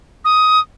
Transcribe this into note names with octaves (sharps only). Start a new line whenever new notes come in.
D#6